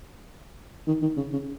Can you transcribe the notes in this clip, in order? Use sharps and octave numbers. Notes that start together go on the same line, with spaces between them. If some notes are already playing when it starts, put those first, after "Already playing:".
D#3
D#3
C#3
C#3